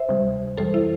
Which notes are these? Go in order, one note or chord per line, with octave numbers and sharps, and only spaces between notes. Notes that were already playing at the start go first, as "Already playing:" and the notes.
Already playing: C5 E5
D2 C3 G3
F2 E3 G3 A4 C5
E4